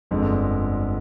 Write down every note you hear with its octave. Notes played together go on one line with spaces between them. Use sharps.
G1 F2 D3 G#3